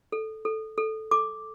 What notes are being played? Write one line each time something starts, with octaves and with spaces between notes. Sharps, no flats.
A4
A4
A4
A4 D6